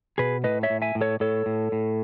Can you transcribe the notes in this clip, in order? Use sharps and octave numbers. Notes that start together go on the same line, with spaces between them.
B2 G#4 B4
A2 B4 D#5
C#5 E5
A2
E5 G#5
A2
A4 C#5
A2 A4 C#5
A2
A2